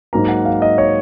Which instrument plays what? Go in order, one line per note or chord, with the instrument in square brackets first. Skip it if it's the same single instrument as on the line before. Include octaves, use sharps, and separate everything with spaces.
[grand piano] G#2 F#3 A#3 A#5
F#5
F5
D#5
C#5